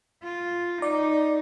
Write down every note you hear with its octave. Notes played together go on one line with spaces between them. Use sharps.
F4
D#4 D5